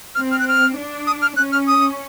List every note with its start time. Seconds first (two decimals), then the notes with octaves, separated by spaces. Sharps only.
0.15 C4 F6
0.31 F6
0.39 F#6
0.48 F6
0.77 D4
1.07 D#6
1.22 F6
1.36 C#4 F#6
1.52 F6
1.67 D#6